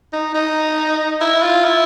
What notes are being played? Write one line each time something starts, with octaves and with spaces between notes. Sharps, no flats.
D#4
D#4
E4
F4
E4